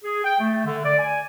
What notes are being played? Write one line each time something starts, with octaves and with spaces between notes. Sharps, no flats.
G#4
G5
A3
D3
D5
G#5